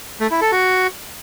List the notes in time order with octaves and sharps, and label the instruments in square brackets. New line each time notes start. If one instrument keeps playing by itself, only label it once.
[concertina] A3
E4
A4
F#4